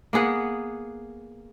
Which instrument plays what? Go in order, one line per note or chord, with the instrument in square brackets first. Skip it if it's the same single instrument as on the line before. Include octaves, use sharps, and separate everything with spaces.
[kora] A#3 B3 G#4 F#5